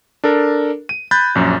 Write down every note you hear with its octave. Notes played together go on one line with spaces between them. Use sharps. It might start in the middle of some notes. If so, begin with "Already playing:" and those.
D4 A4 A#4
D#7
B5 F#6 G6 A6
A#1 F#2